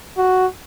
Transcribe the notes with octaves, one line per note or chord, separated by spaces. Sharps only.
F#4